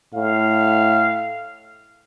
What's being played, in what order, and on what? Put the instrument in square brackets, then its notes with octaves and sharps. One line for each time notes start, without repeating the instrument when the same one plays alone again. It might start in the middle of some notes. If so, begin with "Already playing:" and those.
[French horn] A2 [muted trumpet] F5